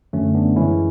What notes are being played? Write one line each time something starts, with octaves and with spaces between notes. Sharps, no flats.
F#2 D3 F#3 A3 C#4
B3 D4
F#2 E3 G#3 C#4 E4